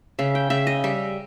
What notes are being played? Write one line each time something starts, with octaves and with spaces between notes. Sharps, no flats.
C#3 E5
G5
C#3 E5
D#5
G3 E5